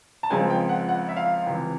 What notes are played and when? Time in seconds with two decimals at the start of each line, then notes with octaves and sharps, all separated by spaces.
0.23 A5
0.30 C#2 C#3 F3 G#3 C4 G#5
0.50 G5
0.69 F#5
0.89 F#5
1.09 E5
1.17 F5
1.47 C#2 C3 E3